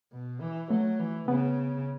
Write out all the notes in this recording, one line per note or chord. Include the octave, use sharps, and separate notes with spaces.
B2
E3
F#3 A3
E3
C#3 B3